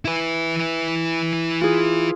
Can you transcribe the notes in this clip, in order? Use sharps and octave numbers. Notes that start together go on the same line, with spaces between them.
E4 B4
F4 G#4